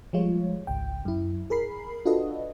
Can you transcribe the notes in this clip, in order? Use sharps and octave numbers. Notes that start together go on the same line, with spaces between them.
F3 G3 G#3 F4 C#5
G#1 C#2 G5
F#2 E4
G#4 A#4 B5 C7
D4 F4 F#4 A4 B4 D#5